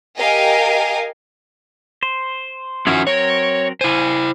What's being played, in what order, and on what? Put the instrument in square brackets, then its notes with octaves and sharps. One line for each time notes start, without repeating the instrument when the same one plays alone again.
[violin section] G4 A#4 D#5 F5 G#5
[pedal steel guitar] C5
[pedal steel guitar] D#3 F3 E4 [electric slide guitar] C#4 F#4 F#5
[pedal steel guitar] F#3 C4 A#4 [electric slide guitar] C#5
[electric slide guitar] E4 C5 [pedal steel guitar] G#5